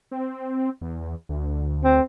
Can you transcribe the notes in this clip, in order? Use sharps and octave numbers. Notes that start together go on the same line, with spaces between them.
C4
E2
D2
C4